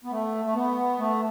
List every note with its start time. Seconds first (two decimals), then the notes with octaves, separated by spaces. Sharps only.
0.04 B3
0.11 A3
0.45 A3
0.54 B3
0.98 A3